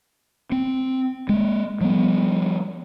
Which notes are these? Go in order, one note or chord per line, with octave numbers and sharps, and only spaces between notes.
C4
G#3 A#3
F3 G3 B3